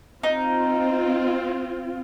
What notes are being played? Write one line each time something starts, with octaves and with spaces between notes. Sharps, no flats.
C4 D#4 F4